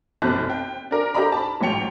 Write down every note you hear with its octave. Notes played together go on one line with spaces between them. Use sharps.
F1 B1 F#2 C4 A5 F#6
G5
D4 A#4
D4 G4 A4 D#5 A#5 B5
A5 B5
A1 G#2 F#3 G5 C#7 F7